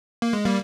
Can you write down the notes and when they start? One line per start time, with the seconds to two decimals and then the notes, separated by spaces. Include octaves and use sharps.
0.22 A#3
0.33 G#3
0.45 G3 A#3